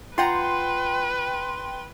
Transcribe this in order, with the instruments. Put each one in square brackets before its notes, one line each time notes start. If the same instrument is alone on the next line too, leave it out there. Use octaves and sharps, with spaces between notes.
[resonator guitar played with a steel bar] F4 F#5 A#5 [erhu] B4 [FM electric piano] G5 C6